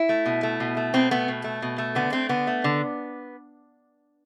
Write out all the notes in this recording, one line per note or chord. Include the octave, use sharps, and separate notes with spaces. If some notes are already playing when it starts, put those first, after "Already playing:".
Already playing: E4
A3
B2
A3
B2
A3
B2 C4
A3 B3
B2
A3
B2
A3
D3 B3
A3 C4
D3 B3
A3
D3